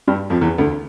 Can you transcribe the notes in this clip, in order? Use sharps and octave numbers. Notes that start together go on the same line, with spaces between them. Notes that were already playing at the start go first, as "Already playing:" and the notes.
G2 G3
F2 F3
E2 E3
D2 D3